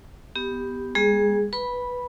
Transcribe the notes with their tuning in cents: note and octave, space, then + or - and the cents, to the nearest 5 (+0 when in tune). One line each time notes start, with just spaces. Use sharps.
B3 +0 G4 +0
G#3 -40 B3 -45 G#4 +0
B4 +0 B5 -10